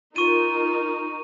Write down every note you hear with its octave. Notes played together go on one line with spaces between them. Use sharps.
D#4 F4 A#4 C#6 D#7